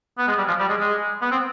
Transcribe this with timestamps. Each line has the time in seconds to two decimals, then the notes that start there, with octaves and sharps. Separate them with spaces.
0.18 B3
0.28 G#3
0.38 G3
0.48 F3
0.59 G3
0.69 G#3
0.80 G#3
1.22 B3
1.31 C4